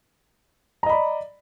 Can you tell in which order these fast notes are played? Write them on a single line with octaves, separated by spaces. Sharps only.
A#5 D#5 B5 D5